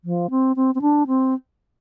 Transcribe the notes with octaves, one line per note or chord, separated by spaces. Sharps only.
F3
C4
C4
C4
D4
C4